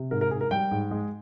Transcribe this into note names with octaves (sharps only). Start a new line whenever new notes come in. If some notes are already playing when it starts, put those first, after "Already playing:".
Already playing: C3
G#2 A#4
A#4
G#2 G#4
A#4
G3 G5
G#2
G#3